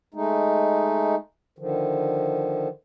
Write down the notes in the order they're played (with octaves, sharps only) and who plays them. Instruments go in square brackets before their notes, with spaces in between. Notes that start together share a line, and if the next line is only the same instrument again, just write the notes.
[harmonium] G#3 A3 D#4
D3 D#3 F3